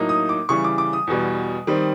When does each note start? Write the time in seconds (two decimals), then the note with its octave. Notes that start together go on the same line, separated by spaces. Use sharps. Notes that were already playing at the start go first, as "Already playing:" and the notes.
Already playing: A2 F#3 A#3 D#4
0.09 D#6
0.29 D6
0.49 C#3 E3 G3 C#6
0.64 D6
0.78 D6
0.93 D#6
1.07 E2 B2 G3
1.67 D#3 G3 C4